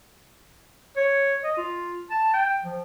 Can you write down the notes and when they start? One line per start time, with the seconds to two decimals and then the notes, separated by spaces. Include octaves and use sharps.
0.97 C#5
1.44 D#5
1.58 F4
2.11 A5
2.34 G5
2.64 F3